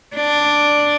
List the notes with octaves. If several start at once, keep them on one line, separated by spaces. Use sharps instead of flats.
D4